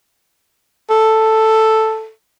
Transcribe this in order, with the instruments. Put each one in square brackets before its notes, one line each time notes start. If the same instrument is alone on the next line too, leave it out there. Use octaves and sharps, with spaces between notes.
[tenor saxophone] A4